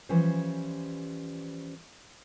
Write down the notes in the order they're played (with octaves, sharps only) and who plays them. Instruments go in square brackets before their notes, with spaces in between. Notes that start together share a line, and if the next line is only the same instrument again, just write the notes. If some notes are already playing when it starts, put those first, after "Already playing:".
[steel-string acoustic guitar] E3 F3 G3 C#4 C5